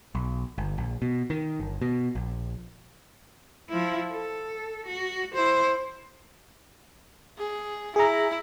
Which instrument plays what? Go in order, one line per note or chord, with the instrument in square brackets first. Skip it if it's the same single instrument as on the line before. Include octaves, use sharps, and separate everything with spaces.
[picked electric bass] B1
G1
A#1
B2
D#3
G1
B2
A#1
[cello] F3 E4
A4
F#4
E4 C5
[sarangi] G#4
[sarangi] E4 [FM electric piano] G#4 A#5